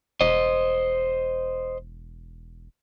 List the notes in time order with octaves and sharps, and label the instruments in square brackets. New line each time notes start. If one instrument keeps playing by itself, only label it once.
[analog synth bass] E1 [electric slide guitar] C5 D#5